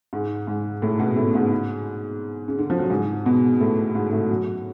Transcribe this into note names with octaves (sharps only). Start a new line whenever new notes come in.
G#2 G#3
G#2 G#3
A2 A3
B2 B3
A2 A3
G#2 G#3
C#3
D3
F3
F#3
G#2 G#3
B2 B3
A2 A3
G#2 G#3
A2 A3
F#2 F#3